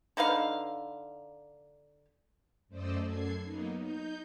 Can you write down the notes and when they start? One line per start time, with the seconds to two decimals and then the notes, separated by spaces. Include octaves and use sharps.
0.17 D3 D#4 B4 F5
2.68 F#2 A3 C5 D5 D#5 E6
3.03 F#2 A4 G#6 C7
3.43 F#3 A#3 B3 D#4
3.77 D#4 G6